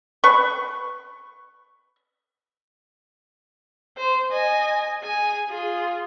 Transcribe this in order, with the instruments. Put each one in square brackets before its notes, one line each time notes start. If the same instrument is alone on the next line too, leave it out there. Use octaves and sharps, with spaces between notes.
[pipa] B4 C#6
[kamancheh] C5
D#5 G#5
G#4 G#5
F4 G#4